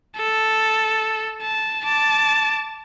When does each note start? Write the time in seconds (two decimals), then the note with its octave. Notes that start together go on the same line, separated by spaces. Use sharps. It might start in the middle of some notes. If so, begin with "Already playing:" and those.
0.16 A4
1.42 A5
1.85 A5 D6